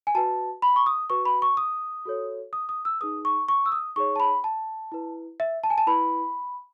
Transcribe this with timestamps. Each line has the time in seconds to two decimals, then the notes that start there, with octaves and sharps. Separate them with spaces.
0.07 G#5
0.15 F#4 B4 A5
0.62 B5
0.76 C#6
0.86 D#6
1.10 F#4 B4 C#6
1.25 B5
1.42 C#6
1.57 D#6
2.05 F#4 A4 C#5
2.53 D#6
2.69 D#6
2.85 E6
3.00 D#4 G#4 B4 D#6
3.25 C#6
3.48 C#6
3.66 E6
3.72 D#6
3.96 D#4 G#4 C#5 C#6
4.16 A5
4.20 B5
4.44 A5
4.92 E4 B4
5.40 E5
5.64 A5
5.70 G#5
5.78 A5
5.87 E4 B4 B5